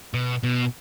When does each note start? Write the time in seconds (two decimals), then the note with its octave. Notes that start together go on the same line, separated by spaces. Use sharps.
0.14 B2
0.43 B2